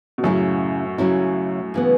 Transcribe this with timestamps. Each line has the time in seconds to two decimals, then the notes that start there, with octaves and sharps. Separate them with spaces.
0.18 B2
0.23 F#2 A2 C#3 F#3 C#4 E4
0.98 C#3 F#3 C#4 E4
1.74 C#3 E3 B3